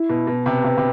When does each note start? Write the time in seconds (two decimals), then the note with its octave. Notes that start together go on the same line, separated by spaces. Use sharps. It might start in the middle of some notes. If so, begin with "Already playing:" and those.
Already playing: E4
0.09 B2
0.27 B2
0.46 C3 B4
0.64 C3
0.77 C3